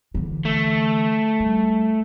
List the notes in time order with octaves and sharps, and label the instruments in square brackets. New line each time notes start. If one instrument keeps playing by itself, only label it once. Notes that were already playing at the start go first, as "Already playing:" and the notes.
[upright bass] D3 E3
[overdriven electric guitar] A3
[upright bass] G3